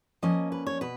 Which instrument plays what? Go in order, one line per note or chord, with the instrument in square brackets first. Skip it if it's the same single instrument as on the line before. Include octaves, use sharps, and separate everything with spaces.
[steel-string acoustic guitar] F3 A#3 C#4 D#5
B4
C#5
B2 B4